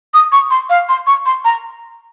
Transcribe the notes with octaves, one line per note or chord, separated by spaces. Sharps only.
D#6
C#6
C6
F5
C6
C#6
C6
A#5